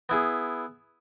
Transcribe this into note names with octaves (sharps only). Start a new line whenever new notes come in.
B3 E4 G#4